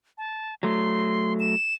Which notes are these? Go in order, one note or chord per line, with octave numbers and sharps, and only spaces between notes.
A5
F#3 A3 C6
E7